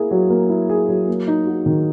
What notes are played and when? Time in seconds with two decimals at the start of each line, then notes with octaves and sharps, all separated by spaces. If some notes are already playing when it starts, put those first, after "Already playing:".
Already playing: A#3 E4 G#4
0.11 F#3
0.30 A#3
0.49 E4
0.69 G#4
0.88 F#3
1.08 A#3
1.27 D#4
1.47 F#4
1.66 D#3